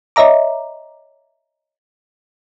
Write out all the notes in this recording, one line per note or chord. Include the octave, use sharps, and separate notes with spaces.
C#5 D#5 E5 A#5 D6